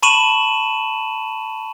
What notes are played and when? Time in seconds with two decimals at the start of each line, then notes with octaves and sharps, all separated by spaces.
0.03 A5 B5 C#6 D#7 E7 F#7